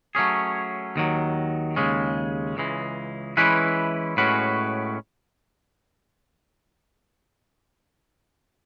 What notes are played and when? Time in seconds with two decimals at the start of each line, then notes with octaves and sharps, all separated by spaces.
0.15 F#3 A3 C#4 G#4
0.96 D#2 D#3 F#3
1.76 D#2 C#3 G#3 C#4
2.57 C#2 C#3 E3 G#3
3.37 E3 G#3 C#4 E4 B4
4.17 A2 G#3 C#4 F#4 B4